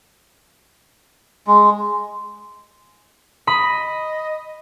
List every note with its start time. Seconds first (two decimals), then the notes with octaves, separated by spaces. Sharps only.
1.47 G#3
3.47 D#5 B5